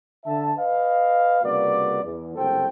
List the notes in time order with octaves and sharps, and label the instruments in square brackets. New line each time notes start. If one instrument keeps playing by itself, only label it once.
[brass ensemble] D3 E5 A5
B4 D#5 F5
C2 C#3 A#3 F#4 B4 D5
E2
F#1 C2 F#4 A4 C5 G5